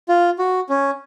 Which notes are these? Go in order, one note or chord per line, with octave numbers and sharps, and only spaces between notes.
F4
F#4
C#4